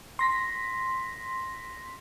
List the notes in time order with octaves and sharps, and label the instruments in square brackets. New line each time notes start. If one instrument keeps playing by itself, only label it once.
[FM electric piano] C6 A#6 B6